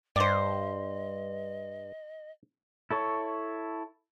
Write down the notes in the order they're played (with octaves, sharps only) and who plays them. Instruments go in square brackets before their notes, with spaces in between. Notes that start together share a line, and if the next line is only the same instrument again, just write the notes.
[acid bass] G2 [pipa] G4 C5 [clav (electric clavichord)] D5 [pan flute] D#5
[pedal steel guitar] E4 A4 C#5 C#6